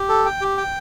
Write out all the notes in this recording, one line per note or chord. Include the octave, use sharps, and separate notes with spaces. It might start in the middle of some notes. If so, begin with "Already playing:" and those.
Already playing: G4
A4
G5
G4
G5